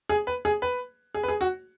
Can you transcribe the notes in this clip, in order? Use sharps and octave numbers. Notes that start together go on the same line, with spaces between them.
G#4
B4
G#4
B4
G#4
B4
G#4
F#4